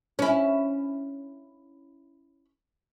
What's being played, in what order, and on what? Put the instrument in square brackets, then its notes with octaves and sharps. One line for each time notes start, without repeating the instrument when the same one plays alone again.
[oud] C#4 E4